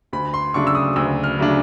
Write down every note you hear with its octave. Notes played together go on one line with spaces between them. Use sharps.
D2 B5
C6
C#3 F#3 A3 D4 C#6
E6
D#6
D2 E6
F6
C#3 F#3 A3 D4